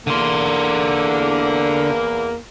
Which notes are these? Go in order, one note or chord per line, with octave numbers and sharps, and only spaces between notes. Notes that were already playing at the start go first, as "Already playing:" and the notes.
E2 D3 A#3 C6